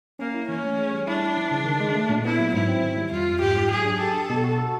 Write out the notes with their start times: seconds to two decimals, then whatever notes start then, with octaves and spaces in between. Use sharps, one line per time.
0.19 A#3 C#4
0.34 E4
0.49 E3 C#4
0.64 A3
0.78 G#4
0.92 G3
1.07 D4 E4
1.23 E4
1.37 F3
1.51 C#3
1.65 D#3
1.80 G#3
1.95 A3
2.09 A#2
2.24 B3 E4
2.39 F#3
2.54 G#2 E4
2.68 C4
2.83 D#3
2.97 G3
3.12 F2 F4
3.27 F2
3.41 G#2 G4
3.56 G#2
3.71 F#3 G#4
3.85 D4
3.99 G4 A4
4.14 G4
4.30 B2
4.44 F#4
4.58 A4